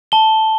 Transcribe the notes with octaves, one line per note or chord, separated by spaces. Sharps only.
A5 G7